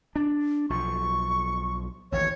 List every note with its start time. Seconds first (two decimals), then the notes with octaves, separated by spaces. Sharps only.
0.16 D4
0.70 B1 F3 C#6
2.12 A1 D#2 C#5